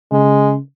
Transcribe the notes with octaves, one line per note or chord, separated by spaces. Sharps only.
C#3 G#3